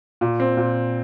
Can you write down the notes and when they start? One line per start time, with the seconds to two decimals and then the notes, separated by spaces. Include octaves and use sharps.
0.21 A#2
0.40 C4
0.57 A#2